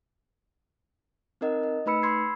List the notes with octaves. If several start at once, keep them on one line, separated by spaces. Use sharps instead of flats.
C4 D#4 A#4 D#5 F#5
D#5
A3 D#4 B4 B5 E6 C#7
B5 C6 E6 G#6 C7